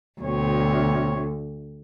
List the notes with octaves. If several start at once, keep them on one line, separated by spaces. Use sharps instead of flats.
D2 B2 C4 C#5